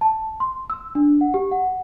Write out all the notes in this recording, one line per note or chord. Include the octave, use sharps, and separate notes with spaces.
A5
C6
E6
D4
F#5
G4
F#5